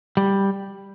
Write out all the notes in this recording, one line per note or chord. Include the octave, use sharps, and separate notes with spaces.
G3